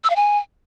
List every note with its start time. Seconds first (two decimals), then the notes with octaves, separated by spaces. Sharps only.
0.04 E6
0.10 F5
0.16 G#5